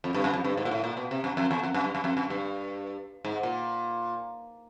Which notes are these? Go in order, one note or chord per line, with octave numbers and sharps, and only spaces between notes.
F2
G2
F#2
F2
G2
G#2
A#2
A2
A#2
B2
C3
F#2
F2
E2
F2
F#2
G2
F#2
F2
F#2
G2
G#2
A#2